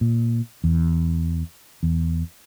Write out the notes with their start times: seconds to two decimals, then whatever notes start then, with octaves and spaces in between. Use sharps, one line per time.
0.01 A#2
0.64 E2
1.83 E2